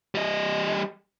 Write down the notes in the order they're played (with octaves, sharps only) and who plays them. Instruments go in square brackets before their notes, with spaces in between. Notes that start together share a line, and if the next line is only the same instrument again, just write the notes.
[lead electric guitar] G3 D#5